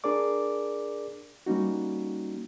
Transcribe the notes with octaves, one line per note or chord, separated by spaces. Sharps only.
D4 G#4 A#4 D5 D6
G3 A#3 C#4 D#4 F#4